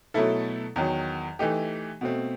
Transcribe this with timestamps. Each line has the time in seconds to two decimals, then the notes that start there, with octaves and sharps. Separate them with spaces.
0.14 B2 F#3 A3 E4 A4
0.76 E2 D#3 F#3
1.39 E3 A3 D#4 G4
2.01 B2 A3 C4